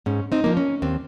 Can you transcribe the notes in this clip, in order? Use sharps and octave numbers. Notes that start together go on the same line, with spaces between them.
G#2 C#4
C4 D#4
F3 A#3
C#4
D#2 C4